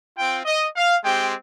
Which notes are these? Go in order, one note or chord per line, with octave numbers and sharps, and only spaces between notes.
C4 F4 G5
D#5
F5
G#3 C4 G4 G5